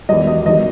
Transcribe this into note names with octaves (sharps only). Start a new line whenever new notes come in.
E2 D#3 F#3 D#5
D#5
E2 D#3 F#3 D#5